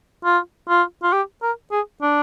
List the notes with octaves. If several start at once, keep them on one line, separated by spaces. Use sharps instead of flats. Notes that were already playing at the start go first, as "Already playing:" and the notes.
F4
F4
F4
G4
A#4
G#4
D4